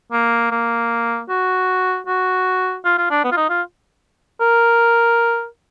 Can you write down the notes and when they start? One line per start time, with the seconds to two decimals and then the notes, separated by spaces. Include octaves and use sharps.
0.12 A#3
0.51 A#3
1.29 F#4
2.07 F#4
2.85 F4
2.98 F4
3.11 D4
3.24 B3
3.32 F4
3.37 D#4
3.50 F4
4.41 A#4